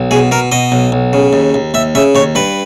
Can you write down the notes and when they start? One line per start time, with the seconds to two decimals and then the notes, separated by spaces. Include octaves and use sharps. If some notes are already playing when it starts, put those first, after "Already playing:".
Already playing: B1
0.11 B2 G#4
0.31 B2 A#4
0.52 B2 D#5
0.72 B1
0.92 B1
1.13 C#3
1.33 D#2
1.54 D#2
1.74 D#2 E5
1.95 C#3 E5
2.15 D#2 C#5
2.35 G2 B4